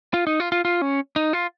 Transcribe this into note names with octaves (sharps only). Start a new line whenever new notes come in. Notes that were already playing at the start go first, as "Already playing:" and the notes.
F4
D#4
F4
F4
F4
C#4
D#4
F4